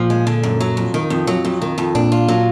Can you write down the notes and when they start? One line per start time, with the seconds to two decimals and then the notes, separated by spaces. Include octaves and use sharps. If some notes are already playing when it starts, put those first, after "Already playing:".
Already playing: A#2 F3
0.10 G#3
0.27 D3
0.43 F#2
0.60 F#3
0.77 F2
0.94 D#3
1.10 F2
1.27 F#3
1.45 F2
1.62 D#3
1.78 F2
1.95 A#2 D4
2.12 F4
2.28 F#3